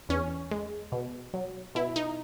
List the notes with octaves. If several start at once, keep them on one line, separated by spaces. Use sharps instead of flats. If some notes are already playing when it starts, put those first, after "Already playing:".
E2 C#4
G#3
B2
F#3
B2 E4
D#4